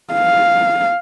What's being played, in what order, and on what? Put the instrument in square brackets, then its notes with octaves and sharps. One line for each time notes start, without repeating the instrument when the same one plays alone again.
[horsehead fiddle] F5